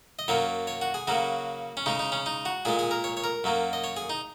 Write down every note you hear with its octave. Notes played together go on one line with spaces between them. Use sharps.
D#5
F#2 F#3 A#3 C#5
C#5
F#4
G#4
C#3 F#3 A#3 F#4
C#4
C#3 G#3 D#4
D#4
C#4
D#4
F#4
A#2 G#3 G#4
G#4
A#4
C#5
C#5
A#4
F#2 F#3 A#3
D#5
C#5
G#4
D#4